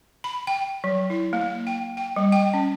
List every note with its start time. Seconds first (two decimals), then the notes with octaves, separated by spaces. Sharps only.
0.24 B5
0.47 G5
0.84 F#3
1.10 E4
1.33 A#3
1.67 G5
1.97 G5
2.16 G3
2.32 G5
2.54 C#4